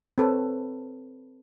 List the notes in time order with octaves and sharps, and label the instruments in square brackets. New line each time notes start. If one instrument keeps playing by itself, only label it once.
[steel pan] C4 A4 B4 C#5